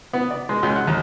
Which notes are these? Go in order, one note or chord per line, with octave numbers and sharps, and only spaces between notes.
B3
D5
G#3
C#2
F#5
D#2